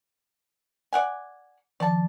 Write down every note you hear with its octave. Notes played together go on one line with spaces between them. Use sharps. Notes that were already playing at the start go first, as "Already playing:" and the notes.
D5 F#5 G#5
D#3 F3 D5 A5